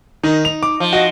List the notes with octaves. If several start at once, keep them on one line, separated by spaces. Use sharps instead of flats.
D#3 D#4
F7
D6
F3
F#4 D#5